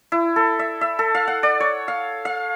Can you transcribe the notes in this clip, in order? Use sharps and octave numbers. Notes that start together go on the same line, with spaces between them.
E4
A4
E5
E5
A4
F5
F#5
D5
C#5
F5
F5